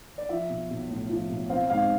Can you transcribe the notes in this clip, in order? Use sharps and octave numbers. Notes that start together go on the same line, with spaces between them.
D5
F3 E5
B1
B1
A2
F3
B1
C4 F5
G#2 F5